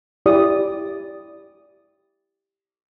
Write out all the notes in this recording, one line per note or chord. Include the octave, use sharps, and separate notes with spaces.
E4 G4 D5 D#6